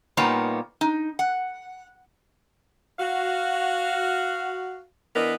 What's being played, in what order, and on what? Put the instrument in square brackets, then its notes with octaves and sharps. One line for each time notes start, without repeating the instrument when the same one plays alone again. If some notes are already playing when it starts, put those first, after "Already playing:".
[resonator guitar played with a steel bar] A#2 G3 A#3 B3 D#4 C#5
D#4
F#5
[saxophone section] F#4 F5
E3 B3 D4 A#4 B4 D#5